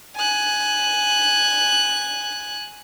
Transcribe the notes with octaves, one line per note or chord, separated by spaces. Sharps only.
G#5 F#6